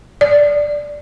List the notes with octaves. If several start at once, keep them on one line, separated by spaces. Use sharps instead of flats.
D5